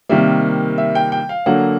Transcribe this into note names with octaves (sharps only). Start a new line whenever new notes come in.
C3 D#3 G3 A#3 E5
E5
G5
G5
F5
D3 F#3 A#3 F#5